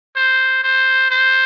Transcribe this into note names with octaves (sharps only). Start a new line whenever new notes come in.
C5
C5
C5